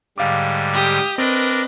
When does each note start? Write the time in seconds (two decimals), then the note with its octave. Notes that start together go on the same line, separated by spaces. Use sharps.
0.18 G#2 D3 G3 F5 D6
0.73 G4 D#6
1.18 C4 D4 A#4 B4 D5 D#5 D7